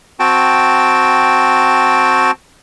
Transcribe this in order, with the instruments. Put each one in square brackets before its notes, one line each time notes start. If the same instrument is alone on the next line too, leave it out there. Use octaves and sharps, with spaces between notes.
[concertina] C4 F#4 G5 A5